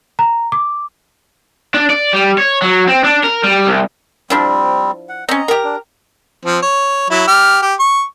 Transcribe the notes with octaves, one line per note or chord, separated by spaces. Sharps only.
A#5
D6
D4
D5
G3
C#5
F#3
C4
D4
A#4
G3
C2
F3 G3 C4 D4 E4
F#5
C4 C#4 D#5 A#5
G4 A#4
D4
F3 C4
C#5
F#3 E4
G4 F6
G4
C#6